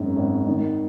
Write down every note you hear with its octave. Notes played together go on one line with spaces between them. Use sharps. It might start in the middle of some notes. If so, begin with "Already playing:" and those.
Already playing: G#1 F#2 C#3
G#1
D#3